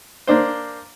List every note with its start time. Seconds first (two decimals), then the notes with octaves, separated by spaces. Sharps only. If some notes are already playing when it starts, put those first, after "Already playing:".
0.27 A#3 D4 C5